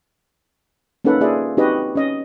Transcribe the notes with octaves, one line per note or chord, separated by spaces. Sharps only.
A#3 C#4 D#4 A4 B4 F#5
A#3 F4 G#4 D5 E5
C4 D#4 F#4 G4 B4 D#5
C#4 D#5